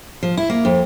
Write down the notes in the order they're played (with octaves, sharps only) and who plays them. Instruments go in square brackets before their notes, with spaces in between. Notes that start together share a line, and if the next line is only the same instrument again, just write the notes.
[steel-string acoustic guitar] F3
E4
A#3
F2